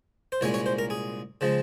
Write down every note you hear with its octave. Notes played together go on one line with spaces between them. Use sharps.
C5
C2 A#2 G#3 C#4 C#5
C#5
C5
A#4
G#4
C#3 F3 G#3